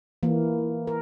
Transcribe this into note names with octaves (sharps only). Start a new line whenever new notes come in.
E3 A#3
A#4